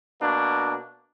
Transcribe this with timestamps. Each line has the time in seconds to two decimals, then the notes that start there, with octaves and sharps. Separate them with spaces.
0.21 B2 A#3 D4